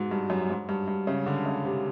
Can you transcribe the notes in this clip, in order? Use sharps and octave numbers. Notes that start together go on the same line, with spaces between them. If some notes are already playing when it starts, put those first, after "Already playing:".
Already playing: G#2 B2
G2
F#2
G#2
G2
G2
C#3
D3
C#3
C3